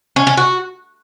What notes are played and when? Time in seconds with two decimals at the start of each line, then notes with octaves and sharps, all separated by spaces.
0.16 C#4
0.27 C#4
0.37 F#4